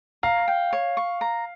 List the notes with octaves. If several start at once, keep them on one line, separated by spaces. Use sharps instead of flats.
F5 A#5
G5
C#5
C#6
A#5